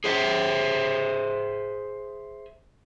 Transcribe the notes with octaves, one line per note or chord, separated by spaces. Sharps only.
G#4 C5 E5